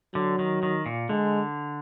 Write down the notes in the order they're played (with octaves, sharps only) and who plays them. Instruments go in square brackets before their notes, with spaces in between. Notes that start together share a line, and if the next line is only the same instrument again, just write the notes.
[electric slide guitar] D3 [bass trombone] F#3
[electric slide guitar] D#3
D#3
A#2
[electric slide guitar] D3 [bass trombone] G#3